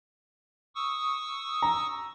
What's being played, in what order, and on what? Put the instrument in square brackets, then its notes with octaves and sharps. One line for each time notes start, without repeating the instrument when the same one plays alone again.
[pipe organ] C#6 D#6 E6
[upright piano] A#5